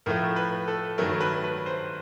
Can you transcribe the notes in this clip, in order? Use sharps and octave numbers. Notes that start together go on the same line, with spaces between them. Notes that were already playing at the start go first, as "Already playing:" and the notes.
A2 F3 A3 A#4
B4
A4
G2 D#3 F#3 A3 A#4
B4
B4
C5